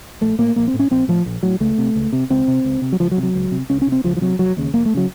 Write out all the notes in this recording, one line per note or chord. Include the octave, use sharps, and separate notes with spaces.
A#1 A3
A2 A#3
A#1 A#3
C4
A2
C#4
A#1 C4
A2 F3
A#1
A2 F#3
C#2 A3
C3
C#2
C3
C#2 C4
C3
C#2
C3
F#3
C#2 F3
F#3
C3
F#3
C#2
C3
C#2 C#4
C#4
C3
C4
C#2 F3
F3
C3 F#3
F1 F#3
D#2 C#3
F1 A#3
A3
C#3 F#3